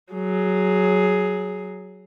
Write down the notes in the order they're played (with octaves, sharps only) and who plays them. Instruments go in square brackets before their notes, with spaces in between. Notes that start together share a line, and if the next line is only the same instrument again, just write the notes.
[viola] F#3 G#4